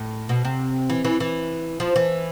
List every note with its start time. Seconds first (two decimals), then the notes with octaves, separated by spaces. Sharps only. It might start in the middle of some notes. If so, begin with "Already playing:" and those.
Already playing: A2
0.29 B2
0.45 C3
0.90 E3
1.05 E3
1.20 E3
1.80 F3
1.96 E3